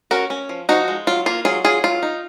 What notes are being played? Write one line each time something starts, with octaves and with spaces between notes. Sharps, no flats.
C#4 F#4 A#4
C#4
F3
F3 D#4 F#4
G#3
F#3 F4
A#3 F4
F#3 F4 G#4
F#3 F4 G#4
F#3 F4
D#4